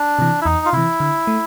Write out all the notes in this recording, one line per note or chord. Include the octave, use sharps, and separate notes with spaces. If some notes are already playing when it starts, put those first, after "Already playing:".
Already playing: D4
C3 E3
E4
E2 D#4
F4
C3 E3 E4
D3
A3